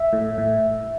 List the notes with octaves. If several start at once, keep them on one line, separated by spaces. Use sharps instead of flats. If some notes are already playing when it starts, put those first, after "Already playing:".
Already playing: E5
A2
A2